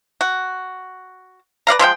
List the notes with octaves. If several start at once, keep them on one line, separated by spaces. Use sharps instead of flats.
F#4
B4 D5 F5 A#5
F3 G#3 E4 G5